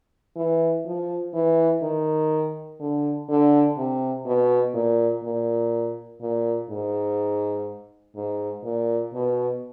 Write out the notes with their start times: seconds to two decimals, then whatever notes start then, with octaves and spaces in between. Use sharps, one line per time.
0.36 E3
0.86 F3
1.34 E3
1.82 D#3
2.80 D3
3.29 D3
3.77 C3
4.26 B2
4.74 A#2
5.23 A#2
6.21 A#2
6.70 G#2
8.15 G#2
8.64 A#2
9.13 B2